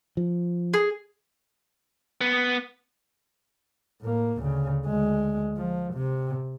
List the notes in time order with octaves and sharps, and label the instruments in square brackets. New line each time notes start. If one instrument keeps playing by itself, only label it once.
[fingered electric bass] F3
[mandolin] G#4
[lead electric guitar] B3
[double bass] A2 A#3
D2 C#3
D2 G#3
F3
C3